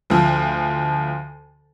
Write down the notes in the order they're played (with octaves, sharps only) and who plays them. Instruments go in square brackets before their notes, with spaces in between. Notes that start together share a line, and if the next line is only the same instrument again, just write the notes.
[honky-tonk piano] D2 F3